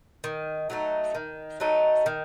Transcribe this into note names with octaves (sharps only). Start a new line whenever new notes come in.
D#3
F#3 A3 D#4
D#3
F#3 A3 D#4
D#3